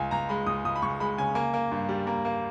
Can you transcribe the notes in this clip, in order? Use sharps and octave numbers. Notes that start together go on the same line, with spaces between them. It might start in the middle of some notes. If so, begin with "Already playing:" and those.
Already playing: C#2 G#5
C#2 A#5
G#3 B5
C#2 D#6
C#2 D#6
B5
C#2 C#6
G#3 B5
C#3 G#5
A#3 G#5
A#3
G2
G3
A#3
A#3